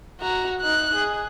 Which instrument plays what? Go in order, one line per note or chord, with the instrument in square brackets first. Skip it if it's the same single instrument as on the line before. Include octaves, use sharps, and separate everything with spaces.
[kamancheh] F#4 A#5
D#4 F#6
G#4